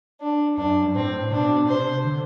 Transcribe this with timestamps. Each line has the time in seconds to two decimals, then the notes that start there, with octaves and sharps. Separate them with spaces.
0.21 D4
0.57 F#2 D4
0.82 G2
0.94 A2 C4
1.31 B2 D4
1.68 C3 C5
2.05 D3